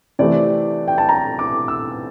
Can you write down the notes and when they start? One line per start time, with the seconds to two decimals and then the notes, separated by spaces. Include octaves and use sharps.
0.19 C3 E3 A3 C4 G4 D5
0.88 G5
0.98 A5
1.09 A#5
1.39 D6
1.68 E6